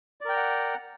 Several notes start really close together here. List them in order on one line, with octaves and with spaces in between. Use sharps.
D5 A#4 G5 A#5 F#5